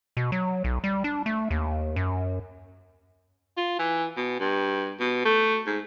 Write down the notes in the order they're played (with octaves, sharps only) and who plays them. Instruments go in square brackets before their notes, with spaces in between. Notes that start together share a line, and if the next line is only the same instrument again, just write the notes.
[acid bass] B2
F#3
B1
G3
D4
A3
D#2
F#2
[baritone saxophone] F4
E3
B2
G2
B2
A3
G#2